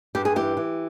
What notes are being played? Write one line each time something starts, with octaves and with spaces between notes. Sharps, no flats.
G2 G4
G#4
E3 G4
E3